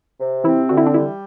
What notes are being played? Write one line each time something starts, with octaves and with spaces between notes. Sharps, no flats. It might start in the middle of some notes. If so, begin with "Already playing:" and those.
C3
E3 C4 E4
D3 F#4
E4
D4
E3 G3 E4